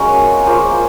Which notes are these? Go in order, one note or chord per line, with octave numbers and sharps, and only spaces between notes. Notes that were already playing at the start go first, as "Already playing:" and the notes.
Already playing: G#3 A#3 C#4 F#4 A#4
A#3 F4 G#4 C5